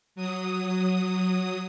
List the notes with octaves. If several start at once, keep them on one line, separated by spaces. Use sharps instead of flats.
F#3 D#6